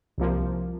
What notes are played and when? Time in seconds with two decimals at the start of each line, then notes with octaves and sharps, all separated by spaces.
0.18 C2 C3 F3 A#3